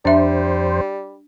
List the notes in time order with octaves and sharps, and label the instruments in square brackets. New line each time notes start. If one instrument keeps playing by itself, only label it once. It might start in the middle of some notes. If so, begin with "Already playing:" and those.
[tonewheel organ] F2 C5 [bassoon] G3 [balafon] D4 E5